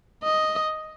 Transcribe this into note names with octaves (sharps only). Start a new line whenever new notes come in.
D#5